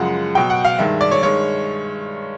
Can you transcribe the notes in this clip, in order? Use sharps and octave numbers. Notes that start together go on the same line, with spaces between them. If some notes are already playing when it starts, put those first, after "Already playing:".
Already playing: F#2 C#3 F3 G#3 F#5
B2 F#3 G5
F#5
F5
G2 D#3 G#3 E5
D5
C#5
G2 D#3 G#3 C#5